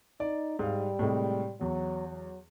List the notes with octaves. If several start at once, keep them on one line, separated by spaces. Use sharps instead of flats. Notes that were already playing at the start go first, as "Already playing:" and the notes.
D#4 D5
G#2 G3 F5
A2 C3 G#3
E2 F#3
F#3